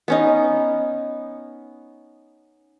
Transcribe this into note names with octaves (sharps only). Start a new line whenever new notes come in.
B3 C#4 D#4